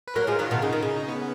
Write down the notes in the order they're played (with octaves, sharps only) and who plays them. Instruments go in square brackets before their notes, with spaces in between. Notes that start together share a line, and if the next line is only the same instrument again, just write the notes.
[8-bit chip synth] B4
[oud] F#3 A#3 [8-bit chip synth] A#4
[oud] F3 G#3
[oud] D#3 F#3 [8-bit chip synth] F4
[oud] B2 D#3
[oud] C#3 [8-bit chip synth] D#4
[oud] D#3
C#3
[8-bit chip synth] B3